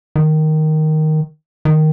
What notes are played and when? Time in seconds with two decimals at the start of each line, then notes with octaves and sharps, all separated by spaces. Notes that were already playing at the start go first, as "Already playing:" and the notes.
0.16 D#3
1.65 D#3